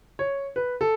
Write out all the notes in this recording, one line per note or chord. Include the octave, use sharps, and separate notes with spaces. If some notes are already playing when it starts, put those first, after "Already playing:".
C#5
B4
A4